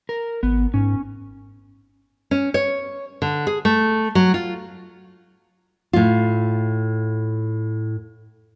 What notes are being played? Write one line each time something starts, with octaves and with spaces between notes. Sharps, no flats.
A#4
G#1 B3
G#2 C#4
C#4
C#5
D3
G#4
A3
F#3
F4
A2 F4